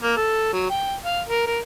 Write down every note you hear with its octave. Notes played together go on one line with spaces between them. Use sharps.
A#3
A4
F#3
G5
F5
A#4
A#4